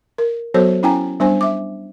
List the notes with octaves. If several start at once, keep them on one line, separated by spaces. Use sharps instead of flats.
A#4
F#3 B3 F#4 A4 C5 C#5
C#4 E4 G5 G#5 A#5
G3 B3 D4 C5 G#5
E5 D6